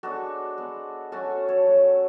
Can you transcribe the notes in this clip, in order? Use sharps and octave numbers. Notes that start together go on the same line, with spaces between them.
G#3 B3 D4 F#4 A4
G#3 B3 D4
F#3 A3 C#4 F#4 A4
A4 C#5
F#3 A3 C#4